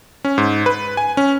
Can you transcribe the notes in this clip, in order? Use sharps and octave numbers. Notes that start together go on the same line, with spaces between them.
C#4
G#2
B4
G#5
C#4